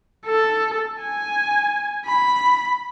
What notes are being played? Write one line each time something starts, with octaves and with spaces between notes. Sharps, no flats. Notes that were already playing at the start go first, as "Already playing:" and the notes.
A4
G#5
B5